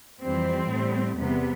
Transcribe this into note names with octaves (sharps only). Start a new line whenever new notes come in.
F2 E3 G3 C4
A2 G3
E2 C3 G3 B3